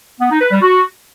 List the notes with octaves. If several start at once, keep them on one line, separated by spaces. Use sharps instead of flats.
B3
D#4
B4
G3
F#4